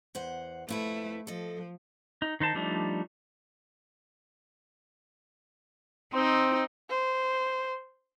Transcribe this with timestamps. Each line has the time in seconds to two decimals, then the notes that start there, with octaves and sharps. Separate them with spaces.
0.15 E2 C5 F#5
0.69 F2 A3 E4 B4
1.27 F3 A4 D#5
2.22 D#4
2.40 D#3 D#4 C5 A5
2.55 F3 G3 A3 D4 D#4
6.14 C4 D#4
6.90 C5